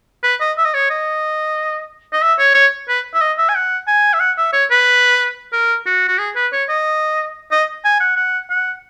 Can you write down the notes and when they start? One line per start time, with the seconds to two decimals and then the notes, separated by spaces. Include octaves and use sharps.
0.23 B4
0.41 D#5
0.58 E5
0.65 D#5
0.74 C#5
0.90 D#5
2.13 D#5
2.22 E5
2.39 C#5
2.55 C#5
2.89 B4
3.14 E5
3.21 D#5
3.38 E5
3.49 G#5
3.55 F#5
3.87 G#5
4.14 E5
4.20 F#5
4.38 E5
4.53 C#5
4.71 B4
5.53 A#4
5.86 F#4
6.08 F#4
6.18 G#4
6.36 B4
6.52 C#5
6.69 D#5
7.51 D#5
7.85 G#5
8.00 F#5
8.17 F#5
8.50 F#5